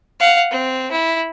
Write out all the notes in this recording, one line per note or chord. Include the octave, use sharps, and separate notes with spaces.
F5 F#5
C4
E4